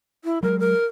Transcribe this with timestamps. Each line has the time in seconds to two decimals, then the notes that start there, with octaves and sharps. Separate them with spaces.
0.24 E4
0.43 F#3 G#3 A#4
0.60 A#4